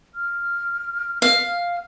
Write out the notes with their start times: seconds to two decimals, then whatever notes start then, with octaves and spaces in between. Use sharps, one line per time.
0.15 F6
1.22 F5